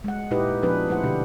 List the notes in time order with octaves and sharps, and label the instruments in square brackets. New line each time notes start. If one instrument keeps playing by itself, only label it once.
[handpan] G#3 F#5
A#2 D#4 E4 G4 B4 D#5
F3 B3 C#4 D4 G#4 B4
F3 A3 E4 C5 F#5
B2 D3 D4 G4